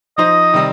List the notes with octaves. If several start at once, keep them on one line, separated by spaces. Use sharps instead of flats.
F3 D#4 C5 D#5
C3 D#3 G3 C4